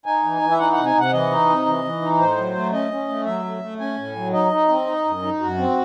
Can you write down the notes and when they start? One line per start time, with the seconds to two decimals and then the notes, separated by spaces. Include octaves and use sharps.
0.06 D#4 G#5
0.24 E3
0.42 E3
0.51 E5
0.59 D#4 F#5
0.73 C3 F#5
0.86 G#5
0.95 C3 F#5
1.13 E3 D#5
1.31 D#4
1.49 C3
1.66 E3
1.84 E3
2.02 D#4
2.19 A2 C5
2.38 F#3
2.55 A3
2.73 C#4 D#5
2.91 C#4
3.08 A3
3.26 F#3 E5
3.45 A3
3.62 A3
3.80 C#4 G#5
3.98 A2
4.16 F#3
4.33 D#4 D#5
4.51 D#4
4.68 C4
4.87 D#4
5.05 F#2
5.22 D#4
5.40 F#2 F#4
5.58 C4